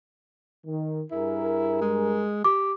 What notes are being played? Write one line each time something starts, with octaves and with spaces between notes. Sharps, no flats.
D#3
G2 E4 G#4 A#4
G#3
G4 D6